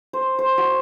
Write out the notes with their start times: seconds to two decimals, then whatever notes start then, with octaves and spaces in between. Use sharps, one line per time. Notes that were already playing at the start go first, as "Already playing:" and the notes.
0.13 C5
0.39 C5
0.58 F#4